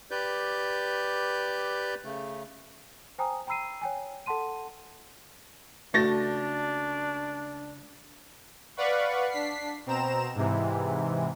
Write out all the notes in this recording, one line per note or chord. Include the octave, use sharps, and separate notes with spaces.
G4 B4 D5 G6
C#3 A3
C5 G5 G#5 A#5 D#6
G5 A#5 B5 E6 C7 D#7
C#5 G5 G#5
A4 F#5 A5 C6 D#7
C#2 A3 D4 F#4 A5 A6 A#6
B4 D5 F5 F#5 B5 C#6
D4 B6 C7
B2 C4 A#5 E7
G#2 C3 E3